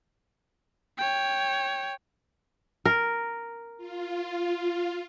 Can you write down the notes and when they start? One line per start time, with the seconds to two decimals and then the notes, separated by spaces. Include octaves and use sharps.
0.98 C#5 G5
2.85 A#4
3.77 F4